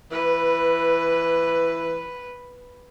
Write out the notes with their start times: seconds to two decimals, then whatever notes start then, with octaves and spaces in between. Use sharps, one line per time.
0.12 E3 B4